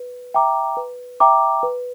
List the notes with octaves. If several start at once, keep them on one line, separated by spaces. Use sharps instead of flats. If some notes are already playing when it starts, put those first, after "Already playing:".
Already playing: B4
E5 G5 A#5 D6
B4
E5 G5 A#5 D6
B4